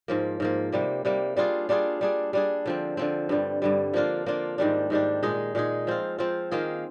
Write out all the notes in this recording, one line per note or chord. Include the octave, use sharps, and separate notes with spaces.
G#2 F3 A#3
G#2 F3 A#3
C3 G3 A#3
C3 G3 A#3
G3 D4 F4 G#4
G3 D4 F4 G#4
G3 D4 G#4
G3 D4 G#4
D3 F3 C4
D3 F3 C4
G2 D3 G3
G2 D3 G3
F3 A#3 D4 F4
F3 A#3 D4 F4
G#2 D#3 G3 D4
G#2 D#3 G3 D4
A#2 G#3 D#4 G#4
A#2 G#3 D#4 G#4
F3 C4 F4
F3 C4 F4
D#3 A#3 F4 G#4